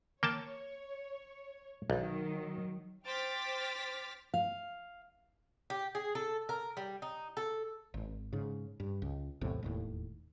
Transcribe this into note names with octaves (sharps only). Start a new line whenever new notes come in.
A#3 C#5 G5 A5
B1 D#3 F#3
C5 G5 D6 F6 A6 B6
F5
G4
G#4
A4
A#4
G3
D#4
A4
G#1
G#2 C#3
G2
C#2
B1 E2 A2 C3
E1 D#2 A2